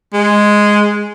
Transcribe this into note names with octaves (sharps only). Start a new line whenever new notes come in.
G#3